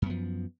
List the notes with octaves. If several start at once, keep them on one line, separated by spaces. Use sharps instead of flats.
F#2 F3 B3